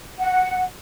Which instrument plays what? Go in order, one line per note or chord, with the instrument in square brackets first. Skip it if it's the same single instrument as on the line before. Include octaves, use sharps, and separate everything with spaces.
[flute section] F#5